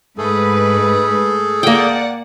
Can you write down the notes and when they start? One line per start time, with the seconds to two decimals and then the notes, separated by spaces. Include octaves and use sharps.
0.18 G#2 A3 G#4 A4 B4
1.63 A#3 D5 F#5 G5